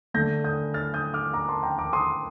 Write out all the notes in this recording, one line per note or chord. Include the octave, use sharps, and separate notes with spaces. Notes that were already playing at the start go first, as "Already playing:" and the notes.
D3 A3 D4 G6 A#6
D#6 G6
F6 A6
D#6 G6
D6 F6
A#5 D6
A5 C6
G5 A#5
A#5 D6
C6 D#6